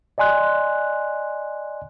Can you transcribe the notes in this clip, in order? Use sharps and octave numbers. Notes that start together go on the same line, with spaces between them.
D5 D#5 G#5 C6 F#6